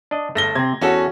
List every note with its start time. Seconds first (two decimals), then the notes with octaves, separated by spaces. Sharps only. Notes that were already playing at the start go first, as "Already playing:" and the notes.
0.11 D4 D#5
0.35 G1 A3 A#6 G7
0.55 C3 C4 G#6
0.81 E2 C#4 F#4 A4